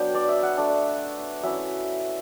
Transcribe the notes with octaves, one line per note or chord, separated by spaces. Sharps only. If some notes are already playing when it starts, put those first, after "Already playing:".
Already playing: F#3 B3 D4 G5
D5
E5
F#5
A3 D4
F#3 C#4 E4 E5